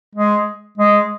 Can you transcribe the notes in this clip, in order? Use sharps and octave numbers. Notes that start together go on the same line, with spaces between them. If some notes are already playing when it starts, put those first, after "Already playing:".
G#3
G#3